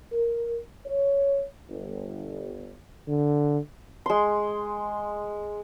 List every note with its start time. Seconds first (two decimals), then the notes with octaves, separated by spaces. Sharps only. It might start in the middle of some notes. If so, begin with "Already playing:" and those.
0.12 A#4
0.86 C#5
1.69 G1
3.08 D3
4.06 G#3 C6